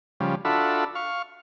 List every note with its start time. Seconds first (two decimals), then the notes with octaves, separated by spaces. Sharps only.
0.20 C#3 F3 G3
0.45 D4 F4 F#4 A4 E5 B5
0.95 F5 C#6